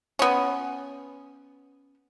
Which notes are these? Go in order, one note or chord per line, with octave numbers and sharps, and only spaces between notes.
B3 C#4